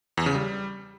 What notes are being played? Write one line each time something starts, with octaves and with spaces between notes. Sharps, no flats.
E2
C#3
G3